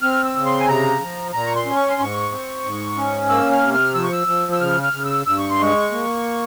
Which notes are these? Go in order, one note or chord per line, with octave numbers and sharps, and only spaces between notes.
C4 F6
E6
C#3
C6
G#5
C3 A#5
F3
A#2 A#5
C#6
C6
C#4
C#6
C6
G#2 C#6
C4
G#2
C#4
A#3 E6
F6
C3
F6
F3 E6
C#6
E6
F3
E6
C#3 F6
F6
C#3
E6
G2 E6
C#6
C6
G#3 C#6
A#3